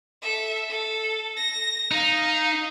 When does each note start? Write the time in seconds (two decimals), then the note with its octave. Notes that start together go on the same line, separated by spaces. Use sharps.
0.22 A4 E5
0.69 A4
1.36 A#6
1.91 D#4 F5